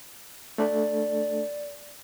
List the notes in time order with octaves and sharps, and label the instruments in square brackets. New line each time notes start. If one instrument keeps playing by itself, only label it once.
[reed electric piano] A3 D4 A4 [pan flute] D5